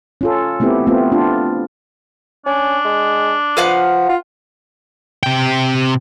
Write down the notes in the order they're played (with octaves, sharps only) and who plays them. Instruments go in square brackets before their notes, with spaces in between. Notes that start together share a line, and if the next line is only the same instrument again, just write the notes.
[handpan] C#4 F4 A4
A3 B3 C4 E4 G4
A3 B3 C4 F4
D4 F4
[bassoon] C#4 [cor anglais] D4
[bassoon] G#3
[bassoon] F3 [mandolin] B4 F5 F#5
[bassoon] F4
[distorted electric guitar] C3 G5